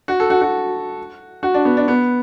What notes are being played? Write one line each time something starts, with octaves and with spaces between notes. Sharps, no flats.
F#4
A4
F#4
F#4
F#4
D4
B3
D4
B3